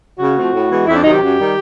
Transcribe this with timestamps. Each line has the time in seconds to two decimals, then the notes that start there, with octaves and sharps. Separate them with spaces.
0.19 C#3 F#4
0.36 F3 A3 C4
0.53 A2
0.69 E3 G#3 B3
0.86 F2 E4
0.95 D4
1.03 C3 D#3 F#3 D#4
1.11 G4
1.20 F#2
1.37 D#3 G3